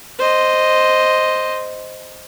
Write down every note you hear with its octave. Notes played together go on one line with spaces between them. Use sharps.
C5 D#5